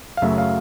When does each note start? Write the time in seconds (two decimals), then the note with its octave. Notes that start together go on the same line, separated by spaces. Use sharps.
0.17 F5
0.22 F#2 C#3 F#3 A3 E5
0.38 F5